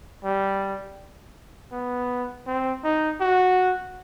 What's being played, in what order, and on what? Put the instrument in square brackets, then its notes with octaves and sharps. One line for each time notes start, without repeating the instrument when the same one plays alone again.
[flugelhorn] G3
B3
C4
D#4
F#4